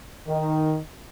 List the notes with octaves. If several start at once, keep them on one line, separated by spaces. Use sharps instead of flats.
D#3